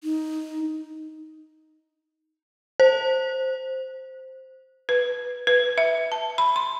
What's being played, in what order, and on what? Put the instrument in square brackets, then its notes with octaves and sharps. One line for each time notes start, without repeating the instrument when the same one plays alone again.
[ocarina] D#4
[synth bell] C5
[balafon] B4
B4
E5
A5
B5
C6